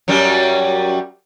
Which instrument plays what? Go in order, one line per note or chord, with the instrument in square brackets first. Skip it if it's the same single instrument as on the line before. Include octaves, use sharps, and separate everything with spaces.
[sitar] F#2 F#3 G3